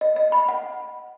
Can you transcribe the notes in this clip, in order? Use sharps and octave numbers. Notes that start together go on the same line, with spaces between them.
D#5
D#5
B5
F#5